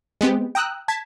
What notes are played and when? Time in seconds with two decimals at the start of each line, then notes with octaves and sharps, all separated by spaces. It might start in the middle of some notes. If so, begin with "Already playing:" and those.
0.21 G#3 B3 C4 G4
0.55 G5 A#5 D#6 E6 F#6
0.88 A5 G#6 B6